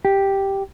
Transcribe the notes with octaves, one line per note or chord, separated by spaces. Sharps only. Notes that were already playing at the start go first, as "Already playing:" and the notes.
G4